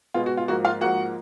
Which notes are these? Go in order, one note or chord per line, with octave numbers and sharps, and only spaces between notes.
B2 G#3 B3 F4
F#4
F4
G#2 F3 A#3 F#4
F4 F5
G#2 F3 A#3 F#4 F#5